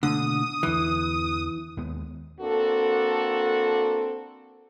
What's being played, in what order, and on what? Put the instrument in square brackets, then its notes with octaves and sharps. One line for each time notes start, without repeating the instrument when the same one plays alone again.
[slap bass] B2 A3 A#3 [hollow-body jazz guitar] D3 [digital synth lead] D#6
[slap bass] E2 D3 [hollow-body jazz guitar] E3
[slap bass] D#2 G#3 B3
[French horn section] A#3 C4 D4 F#4 A4